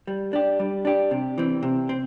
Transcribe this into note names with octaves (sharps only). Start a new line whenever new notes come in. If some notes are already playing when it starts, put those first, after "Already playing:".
G3
D4 G4
G3
D4 G4
C3
E3 C4
C3
C4